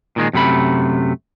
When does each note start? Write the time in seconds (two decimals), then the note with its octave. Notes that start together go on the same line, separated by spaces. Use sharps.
0.16 A#2 D#3 G#3
0.33 F#2 C3 A3 B5